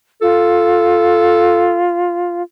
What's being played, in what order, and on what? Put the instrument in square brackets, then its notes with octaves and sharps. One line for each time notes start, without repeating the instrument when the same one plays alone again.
[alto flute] F4 [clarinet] A4